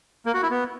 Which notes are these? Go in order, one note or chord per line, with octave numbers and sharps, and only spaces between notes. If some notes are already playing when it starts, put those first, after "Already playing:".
A#3
F#4
E4
B3